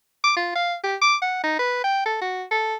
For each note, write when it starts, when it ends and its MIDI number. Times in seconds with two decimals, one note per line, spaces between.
0.24 0.32 86
0.37 0.52 65
0.56 0.75 77
0.84 0.96 67
1.01 1.16 86
1.22 1.43 78
1.44 1.58 63
1.59 1.81 71
1.84 2.04 79
2.06 2.18 69
2.21 2.44 66
2.51 2.75 69